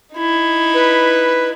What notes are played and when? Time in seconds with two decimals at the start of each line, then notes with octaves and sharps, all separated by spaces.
0.16 D#4 E4
0.74 B4